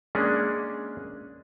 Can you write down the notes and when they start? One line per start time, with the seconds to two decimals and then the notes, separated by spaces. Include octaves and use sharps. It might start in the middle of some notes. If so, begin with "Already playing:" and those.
0.15 G#3 A#3 C#4 D4 G#4